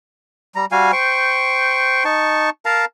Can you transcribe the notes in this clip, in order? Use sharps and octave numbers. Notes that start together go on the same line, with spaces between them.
G3 A#5
G3 F#4 F5 G#5
C5 G5 C#6
D#4 A5 C#6
A#4 F5 A5 A#5